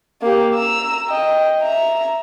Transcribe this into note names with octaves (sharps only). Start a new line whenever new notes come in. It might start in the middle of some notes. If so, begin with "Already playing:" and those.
A#3 G4
A#5 E6
D#5 G5
E5 A#5